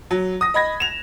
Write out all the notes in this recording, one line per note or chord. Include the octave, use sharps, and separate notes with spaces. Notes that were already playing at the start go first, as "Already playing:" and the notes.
F#3
D#6 A#6
D#5 B5 G#6 A#6
E7 F7